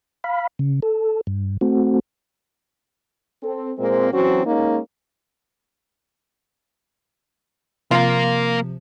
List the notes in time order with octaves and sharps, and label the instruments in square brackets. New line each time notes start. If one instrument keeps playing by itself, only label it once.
[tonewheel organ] F5 B5
C#3
A4
G2
A3 C4 F#4
[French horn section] C4 A4
A#2 G#3 A#3 C4
E3 F#3 C4 C#4 F#4
G#3 A#3 C#4 D#4
[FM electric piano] C3 F3 [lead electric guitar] A#3 A#4 [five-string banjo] F4